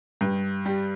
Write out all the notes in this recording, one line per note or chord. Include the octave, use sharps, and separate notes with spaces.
G2
G3